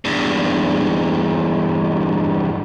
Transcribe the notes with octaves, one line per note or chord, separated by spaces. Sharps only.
E2 G2